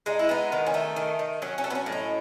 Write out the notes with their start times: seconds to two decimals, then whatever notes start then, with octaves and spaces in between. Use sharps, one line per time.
0.06 G#3 D#4
0.19 E4
0.29 B3 D#4
0.52 D#3
0.66 C#4
0.74 A3 D#4
0.96 D#3
1.19 D#3
1.42 F#3 C#4
1.58 C#4
1.64 A3
1.70 B3
1.75 C#4
1.86 A2
1.92 D#4